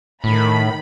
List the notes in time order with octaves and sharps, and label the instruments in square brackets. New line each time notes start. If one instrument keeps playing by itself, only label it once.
[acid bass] A2 [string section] D#3 B5